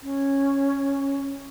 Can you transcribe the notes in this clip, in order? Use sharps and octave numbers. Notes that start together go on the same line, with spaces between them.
C#4